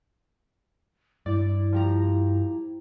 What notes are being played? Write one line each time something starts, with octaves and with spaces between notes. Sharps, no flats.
G2 G3 E4 D5
F3 G4 A#5